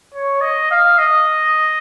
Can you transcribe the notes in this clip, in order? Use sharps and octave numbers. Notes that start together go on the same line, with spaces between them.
C#5
D#5
F5
D#5